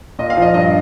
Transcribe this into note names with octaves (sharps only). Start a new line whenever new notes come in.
A#2 D#5
F5
F3
D#5
G2 D#5